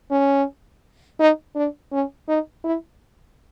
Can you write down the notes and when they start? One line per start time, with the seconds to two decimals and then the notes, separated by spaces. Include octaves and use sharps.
0.11 C#4
1.19 D#4
1.56 D4
1.92 C#4
2.28 D#4
2.64 E4